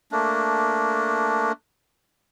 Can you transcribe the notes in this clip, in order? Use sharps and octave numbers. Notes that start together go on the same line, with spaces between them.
A3 A#3 D4